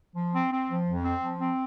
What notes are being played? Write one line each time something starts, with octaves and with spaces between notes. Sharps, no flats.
F3
C4
C4
F3
F2
C4
F3
C4